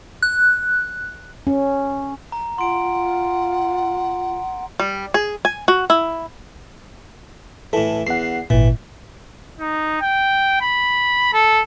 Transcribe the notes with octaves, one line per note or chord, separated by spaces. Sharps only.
F#6
C#4
A#5
F4 F#5 C6 D7
G3
G#4
G#5
F#4
E4
A2 E3 A4
E2 F#5 C7
G#1 A#2 E3
D#4
G5
B5
A4